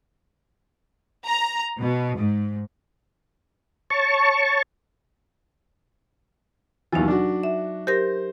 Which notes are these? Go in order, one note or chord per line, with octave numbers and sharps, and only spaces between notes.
A#5
B2
G#2
C#5 A5 C#6
D#2 B2 E3 F#3 D#4
D4 F#4
E5
G4 A#4 C5 A#6